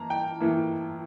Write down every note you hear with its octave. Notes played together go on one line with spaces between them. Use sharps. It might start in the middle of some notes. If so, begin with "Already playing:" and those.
Already playing: E3 A#3 A5 A#5
G5
A2 E3 A#3